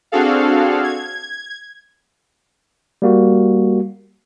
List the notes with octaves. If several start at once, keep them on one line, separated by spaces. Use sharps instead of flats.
C4 D4 F#4 G#4 A4 F5
G#6
G3 A#3 F#4